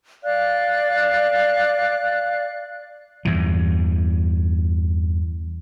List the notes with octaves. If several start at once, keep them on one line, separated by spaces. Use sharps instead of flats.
D5 F5 F#6
E2 G2 E3